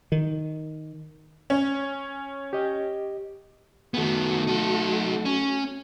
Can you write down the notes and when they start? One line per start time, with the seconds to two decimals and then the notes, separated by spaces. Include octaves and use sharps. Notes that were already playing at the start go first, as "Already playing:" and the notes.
0.12 D#3
1.50 C#4
2.53 G4 D#5
3.94 D#3 A3 B3 F#4
4.47 D#4 A4
5.25 C#4